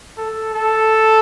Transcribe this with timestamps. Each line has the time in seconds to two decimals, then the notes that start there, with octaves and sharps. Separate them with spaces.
0.17 A4
0.54 A4